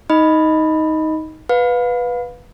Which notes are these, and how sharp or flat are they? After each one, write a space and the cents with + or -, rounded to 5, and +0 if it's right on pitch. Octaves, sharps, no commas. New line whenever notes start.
D#4 +15 D#5 +5 B5 +0
B4 +0 F5 +30